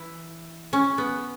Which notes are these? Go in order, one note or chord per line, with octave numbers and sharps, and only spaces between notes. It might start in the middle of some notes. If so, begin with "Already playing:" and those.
Already playing: E3 E4
C#4
B3